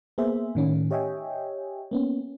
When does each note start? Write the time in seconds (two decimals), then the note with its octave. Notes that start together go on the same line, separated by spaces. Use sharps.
0.18 A#3 B3 G#4 C5 E5
0.55 A2 D#3 C#4
0.91 G4 C#5 D#5 E5 G5 G#5
1.91 A#3 B3 C#4